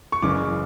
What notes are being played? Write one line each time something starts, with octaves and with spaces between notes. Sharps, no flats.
C#6
F#1 F#2 C#3 E3 D6